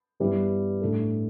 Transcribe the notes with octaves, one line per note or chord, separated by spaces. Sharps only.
G2 E3 G3 B3 E4
A2 A3 D4 A4